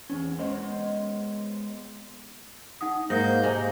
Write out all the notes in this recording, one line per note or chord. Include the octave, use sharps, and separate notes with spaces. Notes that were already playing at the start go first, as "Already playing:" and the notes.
E2 C#4
G#3 B3 C5 C#5 D#5
D#4 F#5 D#6
G#2 A#3 G6 A#6
C3 G#3 D#4